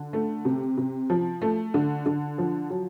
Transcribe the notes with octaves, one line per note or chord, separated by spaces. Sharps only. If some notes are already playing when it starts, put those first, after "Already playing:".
Already playing: D3
A3
C3
C3
F3
A3
D3
D3
F3
F#3